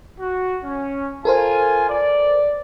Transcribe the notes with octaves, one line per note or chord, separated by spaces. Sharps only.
F#4
C#4
F4 A4 A#4 C5 G#5
D5